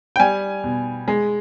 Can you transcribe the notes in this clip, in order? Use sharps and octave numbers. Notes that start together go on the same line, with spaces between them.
G5
G3 G#5
B2
G#3